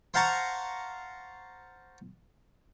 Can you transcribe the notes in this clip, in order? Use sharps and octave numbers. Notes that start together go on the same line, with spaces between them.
C5 F5 F#5 A5 A#5 C#6